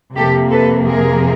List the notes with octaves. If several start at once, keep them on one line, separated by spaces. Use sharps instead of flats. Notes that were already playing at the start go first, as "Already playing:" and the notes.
F2 C3 F3 A#3 G4 A4
A4 B4
G#4 A#4